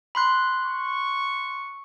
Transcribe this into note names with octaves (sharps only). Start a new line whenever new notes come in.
B5 C6 F#6
C#6